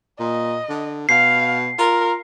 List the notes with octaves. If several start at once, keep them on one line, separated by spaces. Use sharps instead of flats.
A#2 D#5
D3
B2 F5 C7
F4 A#4